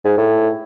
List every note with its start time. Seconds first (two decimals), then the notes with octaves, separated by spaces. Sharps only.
0.05 G#2
0.17 A2